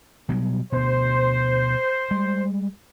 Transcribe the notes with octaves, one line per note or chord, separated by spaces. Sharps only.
B2 F#3 G3
D2 B2 C5
G3 G#3